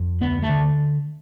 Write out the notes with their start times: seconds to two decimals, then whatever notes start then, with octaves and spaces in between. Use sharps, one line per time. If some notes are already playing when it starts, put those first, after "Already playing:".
Already playing: F2
0.21 D2 B3
0.42 A3
0.49 D3